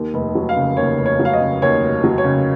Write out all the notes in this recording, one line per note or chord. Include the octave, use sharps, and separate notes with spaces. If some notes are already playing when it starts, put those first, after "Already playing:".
Already playing: D#2
F1
F#3
F5
C#3
D#2 C#5
F1
C#5
F#3
F5
D#5
C#3
D#2 C#5
F1
F#3
C#5
C#3